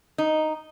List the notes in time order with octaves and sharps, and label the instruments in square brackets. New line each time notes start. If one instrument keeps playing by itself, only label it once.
[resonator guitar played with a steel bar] D#4